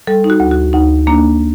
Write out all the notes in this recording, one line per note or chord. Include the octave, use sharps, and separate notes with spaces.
G3 A4
D#4
F#4
D2
F#4
D2 D#4
A#3 D4